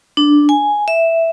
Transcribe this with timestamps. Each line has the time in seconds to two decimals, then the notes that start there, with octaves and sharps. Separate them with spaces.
0.17 D4
0.49 G#5
0.88 E5